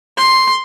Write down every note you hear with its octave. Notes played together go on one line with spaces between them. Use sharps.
C6